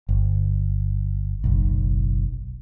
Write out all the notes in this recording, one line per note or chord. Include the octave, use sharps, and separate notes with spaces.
G1
F#1 B1